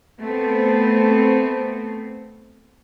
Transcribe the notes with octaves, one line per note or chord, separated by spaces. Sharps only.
A3 B3 C4